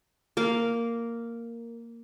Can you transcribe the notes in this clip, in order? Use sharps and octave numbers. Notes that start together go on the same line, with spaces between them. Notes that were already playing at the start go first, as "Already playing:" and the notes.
A#3 A#4 F5